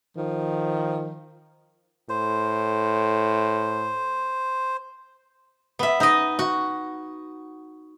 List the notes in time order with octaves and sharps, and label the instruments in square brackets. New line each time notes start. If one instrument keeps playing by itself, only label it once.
[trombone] D#3 [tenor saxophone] F3
[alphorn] A2 [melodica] C5
[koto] B3 E5
D#4 D#5
F#4